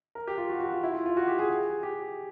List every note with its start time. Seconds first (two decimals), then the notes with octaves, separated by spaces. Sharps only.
0.15 A#4
0.27 G4
0.38 F4
0.49 F#4
0.60 F#4
0.72 F4
0.83 E4
0.94 F4
1.06 F4
1.17 F#4
1.28 G4
1.39 G#4
1.50 G#4
1.83 G4